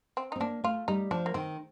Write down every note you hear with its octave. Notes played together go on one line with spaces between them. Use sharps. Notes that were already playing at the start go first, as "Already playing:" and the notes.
C4
D#4
C4
A#3 D4
A3 F4
G3 D#4
F3 D4
A#3
D#3 C4